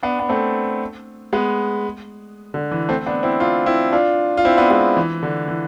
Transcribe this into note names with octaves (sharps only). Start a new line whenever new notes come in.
B3 D4
B3
A3 C4
G#3 B3
D3
E3
A3 C4
B3 D4
C4 E4
D4 F4
C4 E4
D4 F4
F4
C4 E4
B3 D4
G#3 B3
E3
D3
E3